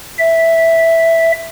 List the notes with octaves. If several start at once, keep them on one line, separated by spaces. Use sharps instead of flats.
E5